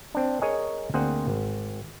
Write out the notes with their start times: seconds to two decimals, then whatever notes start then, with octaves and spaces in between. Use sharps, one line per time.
0.15 C4 D4
0.42 G#4 A#4 C#5 D#5 G#5
0.94 D2 A#3 C4 G#4 C5 F#5
1.28 G#1